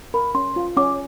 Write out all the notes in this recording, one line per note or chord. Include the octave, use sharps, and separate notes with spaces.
A#4 B5
C#4 C6
F4
C#4 D6